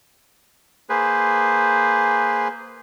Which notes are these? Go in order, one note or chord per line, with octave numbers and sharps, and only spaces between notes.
A#3 G#4 B4 C5